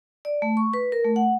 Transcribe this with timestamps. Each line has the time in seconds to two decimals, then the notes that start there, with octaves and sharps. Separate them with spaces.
0.25 D5
0.42 A3
0.57 C#6
0.74 B4
0.92 A#4
1.05 A3
1.16 F#5